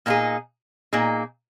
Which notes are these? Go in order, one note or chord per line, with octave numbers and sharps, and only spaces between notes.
A#2 A#3 D#4 G#4
A#2 A#3 D#4 G#4